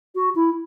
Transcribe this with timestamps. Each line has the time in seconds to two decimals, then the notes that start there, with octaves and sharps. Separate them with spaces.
0.15 F#4
0.35 E4